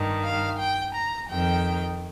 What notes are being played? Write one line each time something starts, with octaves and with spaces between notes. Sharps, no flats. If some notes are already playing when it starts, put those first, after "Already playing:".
Already playing: G2 D#3
F5
G5
A#5
F2 D#3 G5